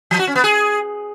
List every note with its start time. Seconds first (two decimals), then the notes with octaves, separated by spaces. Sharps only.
0.11 F3
0.19 F#4
0.27 C#4
0.35 B3
0.44 G#4